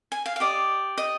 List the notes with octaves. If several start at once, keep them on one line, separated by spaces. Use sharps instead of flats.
G#5
F5
F5
G4 D5 D#5
D#5